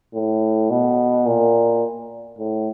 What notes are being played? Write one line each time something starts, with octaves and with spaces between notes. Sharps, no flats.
A2
B2
A#2
A2